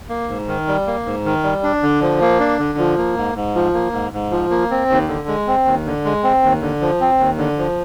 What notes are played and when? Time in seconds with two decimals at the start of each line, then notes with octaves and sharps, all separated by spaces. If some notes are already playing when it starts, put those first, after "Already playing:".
0.09 A#3
0.29 G#2
0.48 D#3
0.68 G3
0.87 A#3
1.06 G#2
1.25 D#3
1.44 G3
1.63 D4
1.83 D3
2.02 F3
2.21 A#3
2.40 D4
2.59 D3
2.78 F3
2.97 A#3
3.17 G#2
3.35 G#2
3.55 F3
3.74 A#3
3.93 G#2
4.13 G#2
4.31 F3
4.51 A#3
4.71 C4
4.90 D#2
5.08 D3
5.28 G#3
5.47 C4
5.65 D#2
5.86 D3
6.05 G#3
6.24 C4
6.43 D#2
6.61 D3
6.81 F3
7.01 C4
7.19 D#2
7.38 D3
7.58 F3